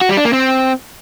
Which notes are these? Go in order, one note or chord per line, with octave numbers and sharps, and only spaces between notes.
F#4
G3
D4
A#3
C4